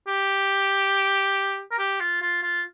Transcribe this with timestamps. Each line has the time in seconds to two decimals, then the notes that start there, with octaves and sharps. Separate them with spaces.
0.08 G4
1.71 A#4
1.78 G4
2.00 F4
2.22 F4
2.43 F4